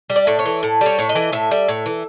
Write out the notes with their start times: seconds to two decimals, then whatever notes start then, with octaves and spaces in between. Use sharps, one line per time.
0.10 G3
0.16 D5
0.27 A2
0.39 C#5
0.45 E3
0.63 A2
0.81 G3 C#5
0.98 A2
1.09 D#5
1.15 E3
1.32 A2 E5
1.51 G3
1.68 A2
1.86 E3